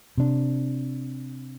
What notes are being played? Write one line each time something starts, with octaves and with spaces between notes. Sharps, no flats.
C3 D4